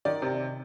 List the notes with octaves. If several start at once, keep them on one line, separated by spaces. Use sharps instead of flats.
D#3 D5
C3